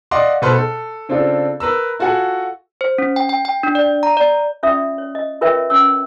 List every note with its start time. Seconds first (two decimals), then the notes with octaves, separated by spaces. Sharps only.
0.11 D5 D#5 F5 F#5 C6 D6
0.42 B2 A4 B4 C5 C6 F6
0.54 A4
1.09 C#3 C4 D4 F4 A4
1.60 A#4 B4 A#5 E6
1.99 F4 F#4 A4 F#5 G#5
2.81 C5
2.98 C#4
3.16 G5
3.29 G5
3.45 G5
3.63 D4
3.75 D5
4.03 A#5
4.17 D5
4.63 C#4 F4 D5 E5 D#6
4.98 C#5
5.15 D#5
5.41 F4 A#4 B4 C#5 E5 G5
5.70 C#4 C#5 E6